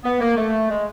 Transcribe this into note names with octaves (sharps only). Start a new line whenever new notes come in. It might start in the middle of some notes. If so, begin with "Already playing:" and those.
B3
A#3
A3
G#3